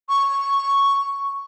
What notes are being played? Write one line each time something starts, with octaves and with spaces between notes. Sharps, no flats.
C#6